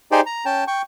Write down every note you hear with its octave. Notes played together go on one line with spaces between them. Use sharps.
D#4 G4 G#4 C5 D5
A#5
C#4 G5 A5
G5 C#6